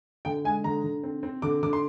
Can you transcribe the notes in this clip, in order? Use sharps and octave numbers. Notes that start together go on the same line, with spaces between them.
D3 G5
G#3 G#5
D3 A#5
D3
C4
C4
D3 D6
D3 D6
C6